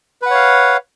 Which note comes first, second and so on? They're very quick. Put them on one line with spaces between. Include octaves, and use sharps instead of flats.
B4 F#5 C#5 F5